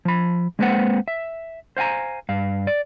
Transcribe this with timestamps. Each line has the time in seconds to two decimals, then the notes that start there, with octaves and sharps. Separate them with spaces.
0.05 F3 B5
0.59 G#3 A#3 C4 B4 C5 F#5
1.08 E5
1.77 C5 F5 F#5 G#5 A#5
2.29 G2 F5
2.67 D5